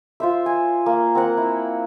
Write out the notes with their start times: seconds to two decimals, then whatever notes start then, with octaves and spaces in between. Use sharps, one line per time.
0.20 F4 C5 E5
0.46 G#5
0.86 A#3
1.15 C4 A#4 F#5
1.37 E4